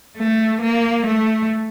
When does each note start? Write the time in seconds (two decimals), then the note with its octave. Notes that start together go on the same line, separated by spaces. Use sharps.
0.18 A3
0.61 A#3
1.06 A3